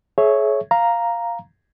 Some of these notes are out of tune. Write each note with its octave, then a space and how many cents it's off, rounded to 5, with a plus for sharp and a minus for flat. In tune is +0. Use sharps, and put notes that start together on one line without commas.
G#4 +40 C#5 +0 E5 +0
F5 +0 A#5 +0